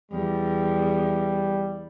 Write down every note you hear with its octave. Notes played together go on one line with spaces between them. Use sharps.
E2 G3